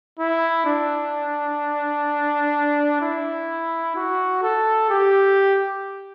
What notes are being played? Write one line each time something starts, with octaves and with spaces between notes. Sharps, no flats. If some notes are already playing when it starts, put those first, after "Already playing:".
E4
D4
E4
F#4
A4
G4